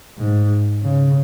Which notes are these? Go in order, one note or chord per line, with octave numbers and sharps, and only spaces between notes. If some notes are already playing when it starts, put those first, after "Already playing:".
G#2
C#3